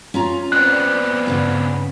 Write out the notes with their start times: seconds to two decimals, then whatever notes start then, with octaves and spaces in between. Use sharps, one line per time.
0.14 C#4 F4 A#5
0.52 F2 G3 B3 C4 D5 F#6
1.26 G2 A#2 C#3